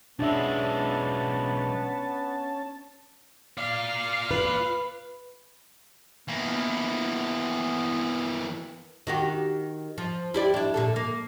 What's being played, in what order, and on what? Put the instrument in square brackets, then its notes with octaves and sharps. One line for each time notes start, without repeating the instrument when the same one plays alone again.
[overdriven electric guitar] B1 G#3 [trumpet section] B3 [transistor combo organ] C#4 A5 [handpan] D4 E5
[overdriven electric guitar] F4 D5 [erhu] F5
[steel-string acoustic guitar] B4
[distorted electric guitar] E3 A#3 [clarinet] B3
[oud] D#3 F#4 G4
F3
E4 G4 D5
D4 E4
A#2 D3 A4
A#3